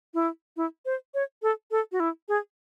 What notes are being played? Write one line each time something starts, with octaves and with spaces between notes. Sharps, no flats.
E4
E4
C5
C#5
A4
A4
F#4
E4
G#4